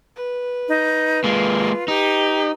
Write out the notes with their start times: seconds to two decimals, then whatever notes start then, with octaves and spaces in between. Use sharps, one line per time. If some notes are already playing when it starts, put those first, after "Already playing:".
0.16 B4
0.69 D#4
1.24 G#3 A#3 F4
1.88 D#4 G4